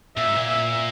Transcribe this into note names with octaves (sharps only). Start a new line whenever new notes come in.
A#2 E5
G#2
A#2
E5